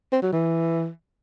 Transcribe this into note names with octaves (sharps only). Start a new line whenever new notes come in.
C4
F#3
E3